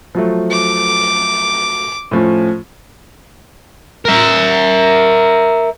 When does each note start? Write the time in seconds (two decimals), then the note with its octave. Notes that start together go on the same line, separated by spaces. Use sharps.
0.15 F3 F#3 A3
0.51 D6
2.11 A2 F3 C#4
4.05 A#4 E5